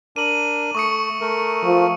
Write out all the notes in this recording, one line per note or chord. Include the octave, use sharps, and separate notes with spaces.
D4 A#4 D#7 F#7
A3 C#6 D#6 C#7
A3 A#4
F3